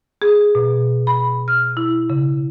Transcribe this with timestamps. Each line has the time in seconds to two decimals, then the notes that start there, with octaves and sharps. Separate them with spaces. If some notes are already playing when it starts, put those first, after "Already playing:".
0.22 G#4
0.55 B2
1.07 B5
1.48 F6
1.77 E4
2.10 C#3